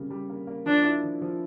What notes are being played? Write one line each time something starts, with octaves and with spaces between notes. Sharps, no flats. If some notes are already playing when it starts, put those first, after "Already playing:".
Already playing: C#3 G3 A#3
G3
A#3
A#3
F3 D4
E4
F3
F3